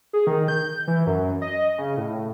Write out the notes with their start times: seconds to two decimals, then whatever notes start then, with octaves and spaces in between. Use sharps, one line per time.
0.13 G#4
0.27 D#3
0.48 G6
0.87 E3
1.06 F#2
1.42 D#5
1.78 C#3
1.97 A2